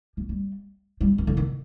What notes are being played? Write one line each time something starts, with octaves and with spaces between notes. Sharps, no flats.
F3
G3
G3
D#3
D3
D#3